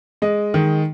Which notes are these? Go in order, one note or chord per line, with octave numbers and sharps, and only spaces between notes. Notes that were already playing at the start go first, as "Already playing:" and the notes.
G#3 D#5
D#3